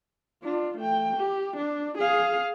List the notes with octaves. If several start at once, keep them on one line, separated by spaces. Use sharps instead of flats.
D4 F4
A3 G5
G4
D4
G#4 F5